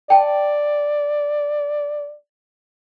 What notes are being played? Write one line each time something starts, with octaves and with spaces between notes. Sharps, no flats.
D5 G5 A5